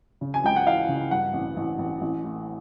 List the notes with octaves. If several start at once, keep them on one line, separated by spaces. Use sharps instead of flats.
C#3
G#5
C#2 G5
F#5
E3 F5
C#3
G2 F#5
A1
A1
A1
A1
A2